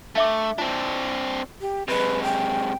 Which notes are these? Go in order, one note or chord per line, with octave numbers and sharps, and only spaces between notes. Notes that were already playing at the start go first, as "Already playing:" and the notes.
A3 D4 E5 D6
C4 D4 F4
G4
C3 G#3 B4
G5